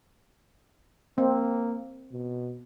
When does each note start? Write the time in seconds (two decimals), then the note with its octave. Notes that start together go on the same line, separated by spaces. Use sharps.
1.18 A#3 C4
2.12 B2